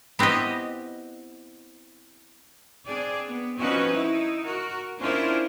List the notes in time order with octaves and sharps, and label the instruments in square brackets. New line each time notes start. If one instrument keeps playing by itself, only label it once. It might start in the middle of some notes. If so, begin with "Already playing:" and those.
[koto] B3 C4 E4 G4 D#5
[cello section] C4 D4 G#4 D5
B3
F3 C4 C#4 D#4 F#4 B4
D#4 E4
F#4 A#4
C#4 D4 E4 F4 A#4 C5